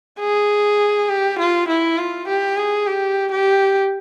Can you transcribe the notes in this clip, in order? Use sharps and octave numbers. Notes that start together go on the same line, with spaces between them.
G#4
G4
F4
E4
F4
G4
G#4
G4
G4